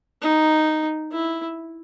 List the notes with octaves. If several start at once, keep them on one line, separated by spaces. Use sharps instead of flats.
D#4
E4